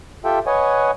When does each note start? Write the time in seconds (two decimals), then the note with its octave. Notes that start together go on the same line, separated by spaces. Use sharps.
0.25 F4 G4 A4 E5 G5
0.47 B4 C#5 D#5 F#5 G#5